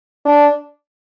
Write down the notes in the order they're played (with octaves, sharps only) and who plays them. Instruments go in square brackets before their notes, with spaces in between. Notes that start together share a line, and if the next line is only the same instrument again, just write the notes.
[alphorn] D4